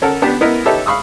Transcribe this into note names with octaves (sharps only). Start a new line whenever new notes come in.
C#4 A4 A#4 F#5
B3 D4 G4
B3 E4 A#4 D#5
D#4 G4 A4 B4 C#5 E5
F5 B5 C#6 D#6 E6